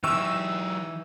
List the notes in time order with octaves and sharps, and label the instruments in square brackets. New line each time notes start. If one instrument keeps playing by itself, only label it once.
[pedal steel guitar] E3 D#4 C#6 [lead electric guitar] F#3 G4 [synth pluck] E6